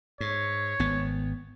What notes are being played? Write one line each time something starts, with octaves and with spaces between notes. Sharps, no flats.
G#2 C#5
G#1 B3